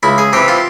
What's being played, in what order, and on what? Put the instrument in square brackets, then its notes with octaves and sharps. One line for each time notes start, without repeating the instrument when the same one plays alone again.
[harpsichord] C#2 E4
G#4
C3 E3 G4
F4